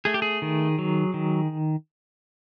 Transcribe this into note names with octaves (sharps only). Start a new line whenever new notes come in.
A3 G#4
G4
G#4
D#3
F#3
D#3